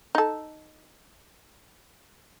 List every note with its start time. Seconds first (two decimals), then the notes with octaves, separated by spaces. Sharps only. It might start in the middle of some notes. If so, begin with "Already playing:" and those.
0.15 D#4 A4